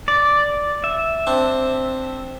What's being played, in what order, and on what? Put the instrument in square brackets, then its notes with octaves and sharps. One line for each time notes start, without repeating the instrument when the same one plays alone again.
[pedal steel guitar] D5
E5
[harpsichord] C4 D4